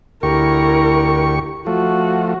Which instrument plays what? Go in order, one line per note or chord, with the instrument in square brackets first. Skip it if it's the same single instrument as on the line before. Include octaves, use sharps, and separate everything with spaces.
[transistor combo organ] D2 G4 C#6 [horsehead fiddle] E4 A#4
[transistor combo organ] F3 A3 [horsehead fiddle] F#4